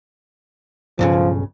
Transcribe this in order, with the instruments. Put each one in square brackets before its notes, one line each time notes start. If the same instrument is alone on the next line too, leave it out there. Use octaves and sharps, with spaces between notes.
[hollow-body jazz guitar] B1 G2 C#3 [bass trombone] F3